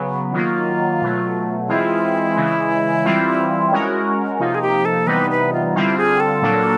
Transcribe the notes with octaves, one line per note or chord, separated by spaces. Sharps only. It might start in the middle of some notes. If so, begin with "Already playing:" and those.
Already playing: C#3 F#3 B3
D#3 F#3 A#3 F4
B2 F#3 A3
E3 G#3 C4 E4 F4 G#4
C#3 E3 G#3
E3 G3 C4 F4
G#3 C#4 F#4 A#4
C3 F3 A#3 D#4 F4
G#4
G4
A4
C3 E3 G3 B3 D#4 B4
B4
F4
D3 G3 C4 E4 F4
G#4
A4
A#2 F#3 A#3 D4